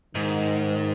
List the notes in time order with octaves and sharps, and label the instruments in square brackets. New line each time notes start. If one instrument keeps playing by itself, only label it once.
[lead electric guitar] G#2 [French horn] D#3